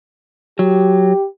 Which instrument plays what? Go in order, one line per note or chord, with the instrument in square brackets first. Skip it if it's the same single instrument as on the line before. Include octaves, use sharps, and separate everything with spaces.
[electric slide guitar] F#3 [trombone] G4